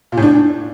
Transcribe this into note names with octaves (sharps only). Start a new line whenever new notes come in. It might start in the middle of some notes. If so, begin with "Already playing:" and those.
A#2
A2
D4